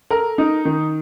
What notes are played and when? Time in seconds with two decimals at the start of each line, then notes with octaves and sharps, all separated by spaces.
0.11 A4 A#4
0.38 D#4
0.65 D#3